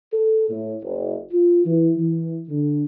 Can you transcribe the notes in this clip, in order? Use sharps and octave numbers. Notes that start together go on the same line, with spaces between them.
A4
A2
F#1
F4
E3
E3
D3